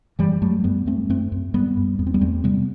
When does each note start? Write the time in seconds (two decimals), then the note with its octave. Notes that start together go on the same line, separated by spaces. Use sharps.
0.19 F#2 E3 G3
0.41 F#2 F#3 A3
0.64 F#2 G3 B3
0.86 F#2 A3 C4
1.09 F#2 A3 C4
1.32 F#2
1.54 F#2 G3 B3
1.77 F#2
1.99 E2 B3
2.07 C4
2.14 G3 B3
2.21 E2 A3 C4
2.44 C3 G3 B3